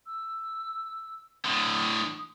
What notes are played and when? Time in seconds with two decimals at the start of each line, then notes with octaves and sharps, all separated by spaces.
0.06 E6
1.45 A2 D3 D#6